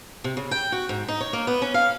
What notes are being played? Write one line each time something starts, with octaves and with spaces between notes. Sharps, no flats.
C3
C#3
G5
F#4
G#2
D#4
C#5
A#3
B3
C#4
F5